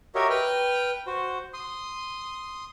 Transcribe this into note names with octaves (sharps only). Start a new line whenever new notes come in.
F#4 G4 A#4 C#5 D#5 E5
B4 G5 F6
F#4 C5
C6 D#6